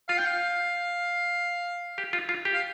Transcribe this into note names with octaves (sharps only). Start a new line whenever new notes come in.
F4 F5
G5
F5
G4
F4
F4
G4
F5